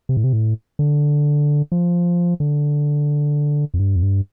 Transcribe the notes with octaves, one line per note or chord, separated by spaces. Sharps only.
C3
A2
C3
A2
D3
F3
D3
F2
G2
F2
G2